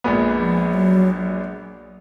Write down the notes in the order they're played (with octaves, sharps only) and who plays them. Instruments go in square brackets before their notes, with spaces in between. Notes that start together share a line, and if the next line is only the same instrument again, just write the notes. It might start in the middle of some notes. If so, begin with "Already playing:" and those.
[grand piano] A#1 A#2 G#3 B3
[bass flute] F3
F#3